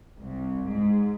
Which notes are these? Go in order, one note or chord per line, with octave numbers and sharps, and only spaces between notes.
C2
G#2